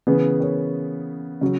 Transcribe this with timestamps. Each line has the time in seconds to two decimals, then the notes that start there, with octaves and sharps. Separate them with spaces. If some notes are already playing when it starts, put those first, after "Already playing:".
0.07 C#3 E3 B3 G#4 B4
0.40 A#4 C#5
1.41 C#3 F#3